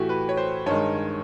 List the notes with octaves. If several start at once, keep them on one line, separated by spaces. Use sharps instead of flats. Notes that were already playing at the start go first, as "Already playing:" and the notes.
Already playing: A2 E3 A3 F#4 G4
B4
C#5
C5
G2 D#3 G#3 C#5